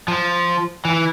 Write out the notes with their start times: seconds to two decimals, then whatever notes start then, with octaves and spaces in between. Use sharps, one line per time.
0.08 F3
0.85 E3